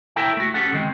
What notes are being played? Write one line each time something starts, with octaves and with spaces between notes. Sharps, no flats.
E4 A4 A#4 E5 G5
A3 F#4
C#4 G4 A4 F#5
D3 D#3 G#3 C4